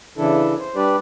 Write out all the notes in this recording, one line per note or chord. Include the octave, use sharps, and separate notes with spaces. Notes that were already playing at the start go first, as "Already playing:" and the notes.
C#3 E3 D4 E4 A4
C5
G3 D4 G4 B4 D5